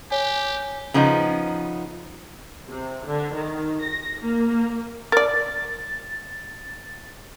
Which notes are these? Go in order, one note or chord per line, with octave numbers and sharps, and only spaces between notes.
G4 C#5 G#5
C#3 F3 B3 D#4
C3
D3
D#3
A#6
A#3
A#4 D5 A6